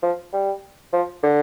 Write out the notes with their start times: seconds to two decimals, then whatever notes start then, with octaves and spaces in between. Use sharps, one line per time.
0.02 F3
0.33 G3
0.93 F3
1.23 D3